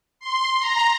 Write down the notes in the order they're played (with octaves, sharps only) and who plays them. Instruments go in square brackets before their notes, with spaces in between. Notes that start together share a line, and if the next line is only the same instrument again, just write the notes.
[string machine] C6
A#5